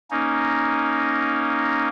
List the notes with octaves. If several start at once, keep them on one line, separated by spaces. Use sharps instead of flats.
A#3 C#4 D#4